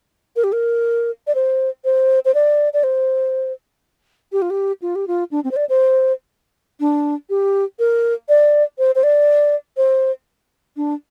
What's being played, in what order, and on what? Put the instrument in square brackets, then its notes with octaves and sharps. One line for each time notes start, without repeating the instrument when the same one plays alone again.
[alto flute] A#4
G4
A#4
D5
C5
C5
C5
D5
D5
C5
G4
F4
G4
F4
G4
F4
D4
C4
C5
D5
C5
D4
G4
A#4
D5
C5
C5
D5
C5
D4